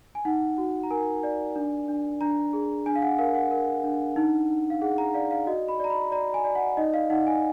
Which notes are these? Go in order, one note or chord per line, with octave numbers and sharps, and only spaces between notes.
G#5
D#4 F#5
F#4
A#5
A#4 G#5
D5
D4
D4
D4 A#5
G#4
D4 G#5
F5
F#5
A#4 F5
F#5
A#4
D4
D#4
D#4
F5
G#4 F#5
A#5
D5 F5
F5
F#4 D#5
B5
D5 A#5
B5
D5 A#5
G#5
D5
F#5
D#4 D#5
F5
D#4 F#5
G#5